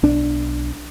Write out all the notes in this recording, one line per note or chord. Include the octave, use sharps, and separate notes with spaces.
B1 D4